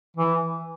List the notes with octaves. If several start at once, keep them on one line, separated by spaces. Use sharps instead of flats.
E3